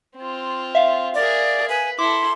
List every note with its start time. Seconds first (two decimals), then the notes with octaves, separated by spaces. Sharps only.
0.17 C4 F4
0.75 E5 F5
1.14 G#4 A#4 D5
1.69 B4 G#5
1.99 E4 A4 C6 D6